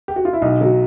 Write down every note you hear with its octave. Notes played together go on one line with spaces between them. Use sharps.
G4
F#4
F4
E4
B1 D#4
F#3